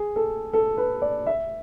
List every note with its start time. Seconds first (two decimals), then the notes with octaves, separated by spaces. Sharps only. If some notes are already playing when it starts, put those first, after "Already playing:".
Already playing: G#4
0.16 A4
0.53 A4
0.77 B4
1.02 D5
1.26 E5